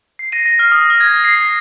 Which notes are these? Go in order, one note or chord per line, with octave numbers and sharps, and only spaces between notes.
C7
A#6 D#7
A#6
F6
D#6
F6
G#6
A#6
C7